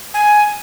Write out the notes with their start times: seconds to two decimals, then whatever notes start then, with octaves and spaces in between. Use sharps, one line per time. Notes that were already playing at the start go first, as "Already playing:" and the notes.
0.14 G#5